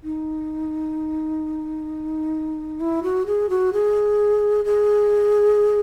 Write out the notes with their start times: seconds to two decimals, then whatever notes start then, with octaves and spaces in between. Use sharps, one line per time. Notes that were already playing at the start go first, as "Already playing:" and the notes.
0.03 D#4
2.80 E4
3.03 F#4
3.26 G#4
3.49 F#4
3.73 G#4
4.65 G#4